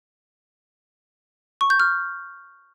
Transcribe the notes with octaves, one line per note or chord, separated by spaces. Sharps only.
C#6
G6
F6